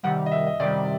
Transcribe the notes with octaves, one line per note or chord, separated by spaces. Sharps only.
C3 D#3 G3 F#5
D#5
E5
D#5
C3 D#3 G3 D5